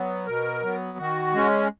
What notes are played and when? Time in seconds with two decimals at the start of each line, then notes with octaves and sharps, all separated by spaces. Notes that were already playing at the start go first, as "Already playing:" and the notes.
Already playing: F#3 B3
0.26 B2 A#4
0.63 F#3 B3
0.98 D#3 F#4
1.33 G#3 C#4